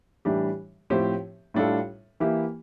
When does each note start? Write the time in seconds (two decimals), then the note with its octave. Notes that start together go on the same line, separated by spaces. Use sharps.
0.25 A2 E3 G3 D4 G4
0.90 A2 F3 C4 G4 C5
1.54 A2 G3 D4 F4 A4
2.20 E3 A#3 E4 G4